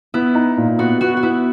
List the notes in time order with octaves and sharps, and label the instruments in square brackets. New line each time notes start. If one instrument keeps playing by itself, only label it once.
[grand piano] B3 [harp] E4
[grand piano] D#4
A#2
[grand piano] B3 [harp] F#4
[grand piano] B3 [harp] F#4
[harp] F#4
[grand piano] B3 [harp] E4